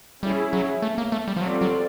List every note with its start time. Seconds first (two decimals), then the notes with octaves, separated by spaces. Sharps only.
0.23 G3 C#4 E4 G#4
0.53 F#3
0.82 A3
0.98 A#3
1.12 A3
1.28 G3
1.37 F3
1.41 F#3 G3 C4 F4 A4 D5
1.61 F#3